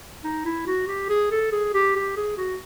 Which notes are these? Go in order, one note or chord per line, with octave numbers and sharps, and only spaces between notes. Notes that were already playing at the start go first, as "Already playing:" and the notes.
D#4
E4
F#4
G4
G#4
A4
G#4
G4
G4
G#4
F#4